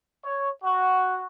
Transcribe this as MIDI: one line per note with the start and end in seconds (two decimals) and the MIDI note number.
0.23 0.48 73
0.64 1.23 66